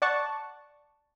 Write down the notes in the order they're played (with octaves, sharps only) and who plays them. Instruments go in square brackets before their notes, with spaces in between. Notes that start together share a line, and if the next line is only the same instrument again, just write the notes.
[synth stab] D5 F#5 A5 C#6